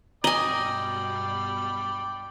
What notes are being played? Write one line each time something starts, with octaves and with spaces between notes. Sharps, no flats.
G2 B2 D5 D#5 G5 G#5 A#5 B5